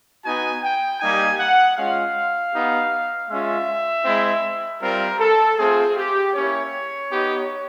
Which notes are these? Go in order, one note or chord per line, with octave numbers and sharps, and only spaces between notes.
B3 D#4 F#4 G#5
G5
G3 A#3 D#4 G4 G#5
F#5
G#3 C#4 F4 F5
B3 D#4 G4
G#3 C#4 F4 E5
G#3 C4 E4
G3 C4 F4 A#4
A4
A3 C4 F4 G#4
G4
A#3 C#4 E4 C#5
B3 D#4 G4